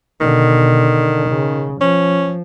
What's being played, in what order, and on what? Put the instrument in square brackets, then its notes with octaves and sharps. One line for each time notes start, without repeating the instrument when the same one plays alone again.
[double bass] B2 D3 [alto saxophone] D#3
[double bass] C#3
[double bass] F3 [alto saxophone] C#4